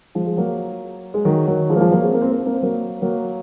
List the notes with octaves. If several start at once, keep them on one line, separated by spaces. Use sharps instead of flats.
F3 G#3
G#3
F#3 A#3
G#3
D#3 F#3
D#3 F#3
F3 G#3
A#3
F3 G#3
F#3 A#3
G#3 C4
A#3
C4
A#3
C4
A#3
C4
F#3 A#3
F#3 A#3